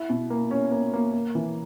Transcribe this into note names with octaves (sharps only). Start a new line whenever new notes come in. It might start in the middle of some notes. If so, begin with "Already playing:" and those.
Already playing: E4
B2
A#3
C#4
A#3
A#3
A#3
E3